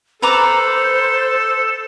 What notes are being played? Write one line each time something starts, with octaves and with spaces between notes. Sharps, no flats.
A4 B4 C5 A#5 D6